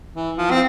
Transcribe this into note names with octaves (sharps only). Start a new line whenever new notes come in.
E3
F3
C4